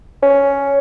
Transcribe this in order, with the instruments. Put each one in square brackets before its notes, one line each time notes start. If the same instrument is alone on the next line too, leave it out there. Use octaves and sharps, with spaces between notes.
[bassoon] C#4